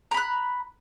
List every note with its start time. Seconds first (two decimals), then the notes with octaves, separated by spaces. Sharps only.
0.11 A#5
0.14 B5
0.17 F#6